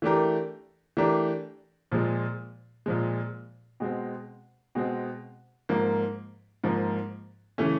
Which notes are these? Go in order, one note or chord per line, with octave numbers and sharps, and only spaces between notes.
E3 A3 D4 G4 A#4
E3 A3 D4 G4 A#4
A#2 F3 G#3
A#2 F3 G#3
B2 G#3 C4
B2 G#3 C4
G#2 F3 A#3
G#2 F3 A#3
C#3 E3 A3 C#4